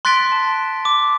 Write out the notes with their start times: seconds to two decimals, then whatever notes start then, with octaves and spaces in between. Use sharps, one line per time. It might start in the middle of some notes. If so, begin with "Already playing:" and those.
0.05 C6 F#6 A6 B6 D7 G7
0.32 A5
0.85 D6